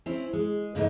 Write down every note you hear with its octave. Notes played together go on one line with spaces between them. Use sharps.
C4 C#4 E4
G#3
G2 A#2 E3 A3 B3 D#4